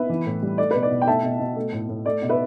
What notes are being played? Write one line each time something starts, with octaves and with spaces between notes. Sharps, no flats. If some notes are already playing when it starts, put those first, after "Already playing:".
Already playing: B3 B4 E5
E3
A2
G3
A3 D5
B4
B2
D5
B2
G5
A3 E5 A5
B2
B2
A3
A2
A2
A3 D5
B2
B4 E5